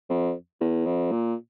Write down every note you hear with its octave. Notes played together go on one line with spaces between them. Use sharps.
F2
E2
F2
A#2